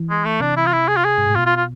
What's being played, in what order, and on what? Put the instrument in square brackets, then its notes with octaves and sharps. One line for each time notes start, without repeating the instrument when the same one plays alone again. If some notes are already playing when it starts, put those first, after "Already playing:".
Already playing: [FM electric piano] E3
[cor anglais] G#3
A3
[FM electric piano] C3 [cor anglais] D4
[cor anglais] E4
F4
E4
G#4
F4
G#4
[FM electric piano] G#2
A2
[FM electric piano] B2 [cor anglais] F4
[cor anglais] F4
F4